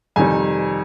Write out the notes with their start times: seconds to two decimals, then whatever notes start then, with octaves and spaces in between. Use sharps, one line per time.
0.16 F2 C3 D#3 G3 G#5